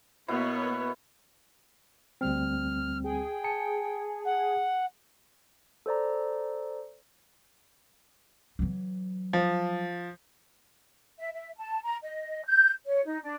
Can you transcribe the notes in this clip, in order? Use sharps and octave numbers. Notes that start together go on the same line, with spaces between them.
B2 A#3 B3 E4 C#5
D2 G3 C4 F6
G#4 G5
G#5 A5 C#7
F#5
A4 C5 D5 A#5
E3 F#3
F3
E5
E5
A5
A#5
D#5
G6
C#5
D#4
D4